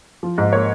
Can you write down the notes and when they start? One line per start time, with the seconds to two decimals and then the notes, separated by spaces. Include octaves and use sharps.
0.23 F3
0.38 G#2
0.53 A#3 C#5